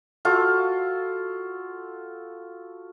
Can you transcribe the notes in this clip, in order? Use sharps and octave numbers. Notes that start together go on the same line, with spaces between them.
F4 F#4 A4